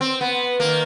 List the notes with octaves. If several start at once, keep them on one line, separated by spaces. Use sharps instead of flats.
C4
B3
D#3 A#3